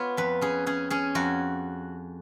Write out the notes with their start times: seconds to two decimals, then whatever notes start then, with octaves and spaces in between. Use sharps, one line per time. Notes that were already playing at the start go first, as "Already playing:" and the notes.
Already playing: B3 F4 C#5
0.17 F2 B4
0.41 C#4 G#4
0.66 C#4 G#4
0.90 C#4 G#4
1.15 F2 F#4